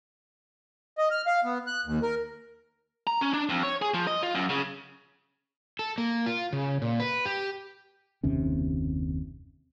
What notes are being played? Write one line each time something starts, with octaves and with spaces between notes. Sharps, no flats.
D#5
F6
F5
B3
F#6
D#2
A#4
A#5
C#4
D4
F2
C#5
G#4
F3
D#5
F4
F#2
C#3
A4
A#3
F4
C#3
A#2
B4
G4
F#1 D#2 C3 C#4